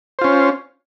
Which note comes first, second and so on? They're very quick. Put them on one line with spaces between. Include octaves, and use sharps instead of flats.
C5 F4 C#4